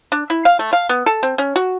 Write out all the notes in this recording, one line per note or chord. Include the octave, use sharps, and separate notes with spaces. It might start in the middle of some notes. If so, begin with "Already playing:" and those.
D4
E4
F5
A3
F5
B3
A4
C4
C#4
F#4